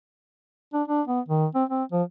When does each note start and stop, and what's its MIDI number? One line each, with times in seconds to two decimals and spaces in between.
0.74 0.83 62
0.88 1.02 62
1.08 1.20 59
1.29 1.46 51
1.55 1.64 60
1.70 1.84 60
1.92 2.03 53